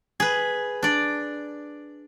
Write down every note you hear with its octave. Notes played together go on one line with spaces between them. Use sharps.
G#4 B4
D4 D5